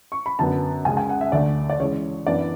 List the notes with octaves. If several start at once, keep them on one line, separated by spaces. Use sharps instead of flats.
C#6
B5
F#2 D3 F#3 B3 A5
C#2 C#3 G#3 G#5
G#5
F#5
E5
D2 D3 A3 D5
D5
C#3 E3 G#3 C#5
F#2 E3 B3 D4 D5